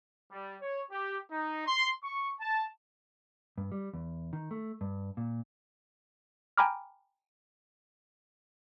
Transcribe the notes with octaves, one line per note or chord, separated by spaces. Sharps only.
G3
C#5
G4
D#4
C6
C#6
A5
G2
G3
E2
D#3
A3
G2
A#2
G5 G#5 A#5 B5 D6 F6